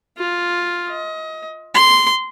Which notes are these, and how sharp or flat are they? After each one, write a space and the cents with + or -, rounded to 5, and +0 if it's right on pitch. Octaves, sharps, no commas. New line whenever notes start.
F4 +5
D#5 +30
C6 -10